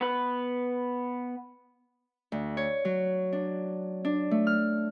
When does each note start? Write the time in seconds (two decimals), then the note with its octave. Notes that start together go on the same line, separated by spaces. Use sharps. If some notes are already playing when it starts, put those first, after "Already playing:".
0.01 B3 B4
2.32 D2
2.57 C#5
2.85 F#3
3.33 D4
4.05 D4
4.31 A3
4.47 F6